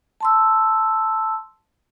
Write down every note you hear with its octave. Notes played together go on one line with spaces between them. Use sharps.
A5 C6 E6